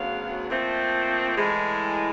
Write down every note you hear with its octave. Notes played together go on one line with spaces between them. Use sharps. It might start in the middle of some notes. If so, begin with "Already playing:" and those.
Already playing: D2 C#3 F#3 B3 F5
A#2 F3 A3 C4
A2 E3 G#3